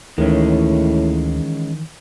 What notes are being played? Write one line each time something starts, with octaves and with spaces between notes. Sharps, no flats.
D2 A2 D#3 E3 G#3 C#4